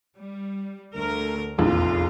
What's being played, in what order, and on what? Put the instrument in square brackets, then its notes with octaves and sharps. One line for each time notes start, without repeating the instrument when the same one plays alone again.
[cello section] G3
D2 A3 A#4
[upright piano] F1 A#1 E2 [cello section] F4